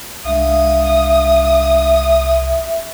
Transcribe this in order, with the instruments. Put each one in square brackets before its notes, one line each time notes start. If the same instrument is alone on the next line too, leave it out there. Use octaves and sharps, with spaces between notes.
[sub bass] C2 [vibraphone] G#3 D4 F5 [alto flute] E5 [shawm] D#6